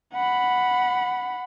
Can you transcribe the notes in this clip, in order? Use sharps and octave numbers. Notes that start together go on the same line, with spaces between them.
F#5 B5